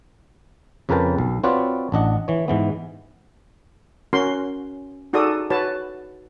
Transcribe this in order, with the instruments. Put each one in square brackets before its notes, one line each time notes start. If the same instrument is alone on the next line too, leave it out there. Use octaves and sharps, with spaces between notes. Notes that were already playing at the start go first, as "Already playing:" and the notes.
[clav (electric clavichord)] F2 C#3 A#4 B4 G5 A5
B1
C4 F4 F#4 B4 C#5 D5
A1 D4 D#5 F#5
E3 C#5
G#2 E3 B3
[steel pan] C#4 F#4 A#4 C6
D#4 F#4 G#4 A4 D5 D#6
F#4 B4 C#5 A5